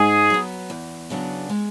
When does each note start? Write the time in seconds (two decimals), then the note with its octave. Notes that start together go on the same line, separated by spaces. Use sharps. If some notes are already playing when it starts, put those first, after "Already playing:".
Already playing: G#2 G#4
0.30 F#3 B3
0.70 E2
1.10 C#3 F#3 B3 D4
1.49 G#3